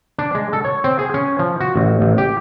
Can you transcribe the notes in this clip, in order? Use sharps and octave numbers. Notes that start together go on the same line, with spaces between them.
D4
G#3
A4
C#5
C4
G#4
C#4
F3
F#4
A1
A1
G4